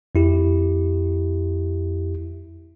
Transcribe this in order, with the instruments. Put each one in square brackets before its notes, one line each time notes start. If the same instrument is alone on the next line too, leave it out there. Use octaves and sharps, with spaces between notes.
[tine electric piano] F2 E4 G4